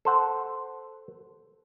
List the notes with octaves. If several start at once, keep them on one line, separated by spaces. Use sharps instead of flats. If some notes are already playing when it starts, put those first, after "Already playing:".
A4 C5 F#5